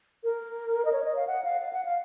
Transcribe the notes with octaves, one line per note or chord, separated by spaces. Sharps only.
A#4
D#5
C#5
D#5
F5
F#5
F5
F5
F#5
F5